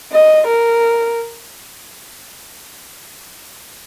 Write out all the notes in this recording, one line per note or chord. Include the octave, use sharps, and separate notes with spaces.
D#5
A#4